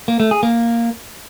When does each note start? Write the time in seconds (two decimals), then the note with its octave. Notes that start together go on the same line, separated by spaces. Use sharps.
0.08 A#3
0.20 A3
0.31 G#4
0.43 A#3